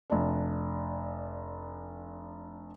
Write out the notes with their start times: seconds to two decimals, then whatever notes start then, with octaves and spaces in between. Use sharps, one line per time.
0.10 F1 D4